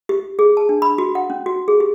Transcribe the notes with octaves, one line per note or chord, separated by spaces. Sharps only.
G4
G#4
A5
D4
B5
F#4
F#5
C#4
F#4
G#4
G4